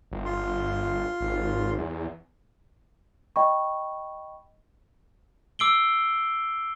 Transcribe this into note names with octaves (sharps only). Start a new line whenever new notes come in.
G1
F4 C6
G#1
E2
D#5 G5 B5 C#6
D6 E6 C7 D7 F#7 G7